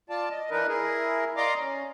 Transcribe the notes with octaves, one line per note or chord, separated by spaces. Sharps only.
F4 D5 A5
D#5
E3 D4 D#4 A#4 B4
E4 G#4 A#4
D5 D#5 F5 A#5 C6 D6
C#4